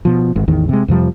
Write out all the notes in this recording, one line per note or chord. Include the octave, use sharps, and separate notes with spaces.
B2 F3
G#1 G#2
A1 E2 D#3
C3 G#3
F2 C3 F3 G3